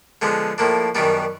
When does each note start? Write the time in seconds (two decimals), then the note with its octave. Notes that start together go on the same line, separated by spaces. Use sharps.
0.22 D3 F3 G#3 B3
0.58 A2 F3 A#3 D4
0.95 F#2 D#3 G3 B3 D4